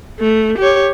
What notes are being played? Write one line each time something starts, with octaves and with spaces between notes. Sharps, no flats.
A3
G4 C#5